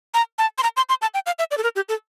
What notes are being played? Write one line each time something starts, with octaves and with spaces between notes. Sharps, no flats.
A#5
A5
C6
A#5
C6
C6
A5
G5
F5
E5
D5
A4
A#4
G4
A4